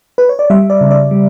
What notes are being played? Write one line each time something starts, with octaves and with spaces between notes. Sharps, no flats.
B4
C#5
D5
G3 E5
D5
C#3
D5
G3